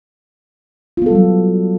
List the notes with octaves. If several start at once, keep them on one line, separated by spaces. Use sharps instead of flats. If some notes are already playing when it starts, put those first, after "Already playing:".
F#3 G3 B3 F4 A4